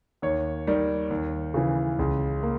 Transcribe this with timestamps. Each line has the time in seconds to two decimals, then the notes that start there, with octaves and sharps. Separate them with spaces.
0.22 D#2 C#5
0.67 D#3 G3
1.11 D#2
1.54 C#3 E3
1.99 C#2
2.43 A#3